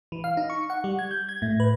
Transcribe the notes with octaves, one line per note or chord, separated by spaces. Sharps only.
E3
F5
D#4
C#6
F#5
G3
G#6
G6
G#6
A2
B4